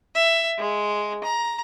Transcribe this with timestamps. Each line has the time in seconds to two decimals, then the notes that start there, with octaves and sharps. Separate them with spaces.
0.15 E5
0.58 G#3
1.24 A#5